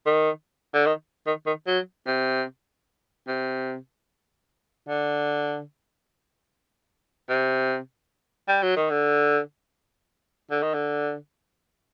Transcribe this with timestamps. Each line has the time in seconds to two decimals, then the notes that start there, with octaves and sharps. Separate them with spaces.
0.06 D#3
0.74 D3
0.86 D#3
1.26 D#3
1.46 D#3
1.67 F#3
2.06 C3
3.27 C3
4.88 D3
7.29 C3
8.48 G3
8.63 F#3
8.76 D#3
8.90 D3
10.51 D3
10.63 D#3
10.74 D3